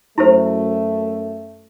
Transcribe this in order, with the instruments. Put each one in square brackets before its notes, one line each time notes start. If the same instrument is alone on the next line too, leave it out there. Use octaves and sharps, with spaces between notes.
[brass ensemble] F#2 A3 [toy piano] E4 G4 C5